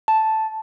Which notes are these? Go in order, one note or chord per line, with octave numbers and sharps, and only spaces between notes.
A5